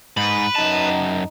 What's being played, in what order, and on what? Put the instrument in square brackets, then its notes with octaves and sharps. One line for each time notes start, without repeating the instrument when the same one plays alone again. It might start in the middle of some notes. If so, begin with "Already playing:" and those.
[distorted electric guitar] G#2 [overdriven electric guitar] B4
[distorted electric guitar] F#2 A5 [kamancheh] D#4